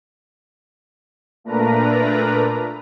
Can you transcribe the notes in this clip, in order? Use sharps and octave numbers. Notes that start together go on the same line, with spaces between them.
A#2 A3 D4 A#4 B4 A#5